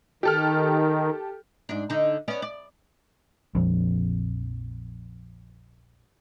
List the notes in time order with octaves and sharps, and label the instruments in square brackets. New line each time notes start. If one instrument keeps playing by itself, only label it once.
[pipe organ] D#3 [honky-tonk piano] G4 A4 F6
[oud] G#2 D4
D3 D#4
B3 C#4 D5
D5
[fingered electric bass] A#1 F2